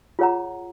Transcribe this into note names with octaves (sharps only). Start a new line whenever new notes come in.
F4 G#4 C#5 F#5 A#5